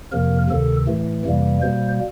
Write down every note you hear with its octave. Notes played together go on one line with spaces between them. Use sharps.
F2 C3 F3 A#3 A#4
D2 C3 D#3 A4
A2 E3 A3
F2 C3 E3 G3 A#3
B2 G3 A#3 C5